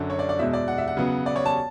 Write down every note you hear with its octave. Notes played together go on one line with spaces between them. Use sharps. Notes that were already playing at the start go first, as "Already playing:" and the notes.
Already playing: F#2 D3 F#3 C#4
C#5
D5
D5
E2 B2 G#3 E5
D5
F#5
E5
F#5
C#3 F#3 B3
D5
C#5
A5